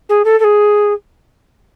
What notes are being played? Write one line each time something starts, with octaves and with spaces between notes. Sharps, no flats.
G#4
A4
A4
G#4